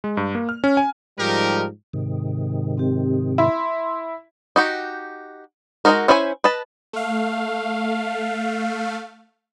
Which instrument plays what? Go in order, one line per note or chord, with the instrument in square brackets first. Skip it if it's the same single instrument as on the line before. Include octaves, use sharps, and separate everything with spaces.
[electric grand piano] G#3
G2
A#3
F6
C#4
G#5
[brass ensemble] G#2 F3 G3 [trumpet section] D#4 G4 A#4
[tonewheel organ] G#2 C3 D#3
[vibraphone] C4 G4
[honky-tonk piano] E4 [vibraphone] C6
[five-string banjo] D#4 F#4 G4
G#3 B3 D#4 F#4 A#4
C#4 E4 C5 D5 G#5
B4 D#5 A5
[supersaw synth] A3 F5